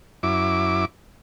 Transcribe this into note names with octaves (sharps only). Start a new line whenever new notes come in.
F#2 E4 D6